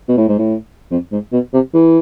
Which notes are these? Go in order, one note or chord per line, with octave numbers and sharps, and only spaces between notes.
B2
A2
G#2
A2
F2
G#2
B2
C3
E3